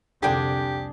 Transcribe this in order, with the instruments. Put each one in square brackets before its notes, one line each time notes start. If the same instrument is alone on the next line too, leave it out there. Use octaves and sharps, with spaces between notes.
[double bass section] C2 F2 [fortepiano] D3 G5 [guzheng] D4 G#4 [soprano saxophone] G4